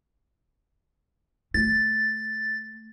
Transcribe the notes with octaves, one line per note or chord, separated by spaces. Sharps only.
A3 A6